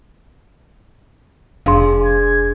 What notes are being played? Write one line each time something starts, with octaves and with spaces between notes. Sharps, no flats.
F1 D4 G#4 F5 C6
G#6